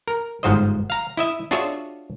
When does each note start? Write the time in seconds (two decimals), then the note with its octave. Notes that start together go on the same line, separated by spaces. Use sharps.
0.08 A#4
0.43 G1 G#2 F3 F#4 C5 D#5
0.90 F5 A#5
1.17 E4 D#5 E5
1.51 D4 F4 F#4 G#4 C#5 E5